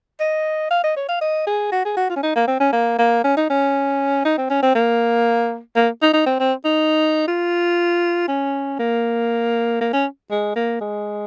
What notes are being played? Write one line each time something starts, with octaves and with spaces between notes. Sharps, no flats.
D#5
F5
D#5
C#5
F5
D#5
G#4
F#4
G#4
F#4
F4
C#4
D#4
A#3
C4
C#4
A#3
A#3
C#4
D#4
C#4
D#4
C4
C#4
C4
A#3
A#3
D#4
D#4
C4
C4
D#4
F4
C#4
A#3
A#3
C#4
G#3
A#3
G#3